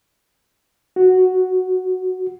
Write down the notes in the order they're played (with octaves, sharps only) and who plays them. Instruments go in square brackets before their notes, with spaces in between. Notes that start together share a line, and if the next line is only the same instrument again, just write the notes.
[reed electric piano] F#4